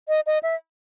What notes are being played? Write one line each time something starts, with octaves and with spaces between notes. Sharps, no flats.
D#5
D#5
E5